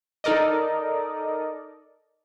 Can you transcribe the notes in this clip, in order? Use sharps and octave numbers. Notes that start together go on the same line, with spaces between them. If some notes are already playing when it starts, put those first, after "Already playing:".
D#4 A4 A#4 D5 D#5